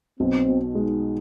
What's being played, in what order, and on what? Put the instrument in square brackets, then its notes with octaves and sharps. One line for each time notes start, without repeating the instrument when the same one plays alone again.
[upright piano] B1 [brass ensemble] C4
[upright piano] B2
[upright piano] G#3 [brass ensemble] D#4